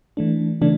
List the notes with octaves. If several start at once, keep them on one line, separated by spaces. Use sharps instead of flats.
E3 A3 D4
C#3 E3 A3 D4